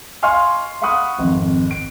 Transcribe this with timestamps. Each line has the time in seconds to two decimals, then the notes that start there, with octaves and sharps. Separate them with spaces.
0.22 D#5 F5 G#5 C6 C#6 F6
0.82 F5 F#5 B5 C#6 D#6 F#6
1.19 G#1 F2
1.71 D7